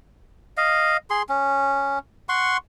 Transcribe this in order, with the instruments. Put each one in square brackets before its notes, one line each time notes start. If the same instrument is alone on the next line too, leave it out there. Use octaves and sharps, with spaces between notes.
[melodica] D#5 F5
G#4 C6
C#4
F#5 C6 C#6